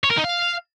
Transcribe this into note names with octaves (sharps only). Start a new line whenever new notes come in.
C#5
A#4
D#4
F5